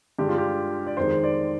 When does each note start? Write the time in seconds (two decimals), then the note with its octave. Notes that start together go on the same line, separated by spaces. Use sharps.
0.19 G2 D3 G#3 G4
0.29 F4
0.38 G4
0.87 D5
0.97 F2 D#3 G#3 C5
1.24 D5